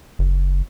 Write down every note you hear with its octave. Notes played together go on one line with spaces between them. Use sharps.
F#1